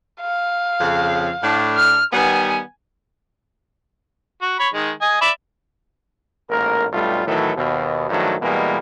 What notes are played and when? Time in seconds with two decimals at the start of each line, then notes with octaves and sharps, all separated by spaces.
0.21 F5
0.80 F2 C#3
1.42 A2 D4
1.77 F6
2.13 D#3 G3 B3 G#5
4.42 F#4
4.59 C#5 B5
4.74 D#3 G#3
5.01 D#5 G#5
5.21 D5 E5 B5
6.50 A1 G#2 A#3 A#4
6.92 B1 G2 G3 A3 F4
7.26 A2 D#3 E3 F#3 A3
7.56 D#2 B2
8.09 G2 D#3 F3 F#3 A3
8.42 B2 E3 G3 G#3 A#3